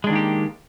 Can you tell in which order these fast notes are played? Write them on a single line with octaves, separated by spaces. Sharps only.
G#3 D4 D#3 A#3 G4